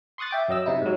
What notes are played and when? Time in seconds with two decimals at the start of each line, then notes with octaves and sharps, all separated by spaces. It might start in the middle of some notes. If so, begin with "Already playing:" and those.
0.18 C6 C#6 D#6 F#6 A6
0.31 E5 G5 D6
0.48 F#2 F#3 D#5 E6
0.66 C3 D#4 E4
0.82 G#2 F#3